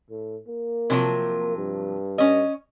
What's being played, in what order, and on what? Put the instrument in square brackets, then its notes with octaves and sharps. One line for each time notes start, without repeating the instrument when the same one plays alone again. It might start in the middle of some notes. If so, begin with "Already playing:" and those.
[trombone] A2
A#3
[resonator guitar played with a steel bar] C3 F3 F#3
[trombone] G2
[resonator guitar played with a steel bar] C#4 D#5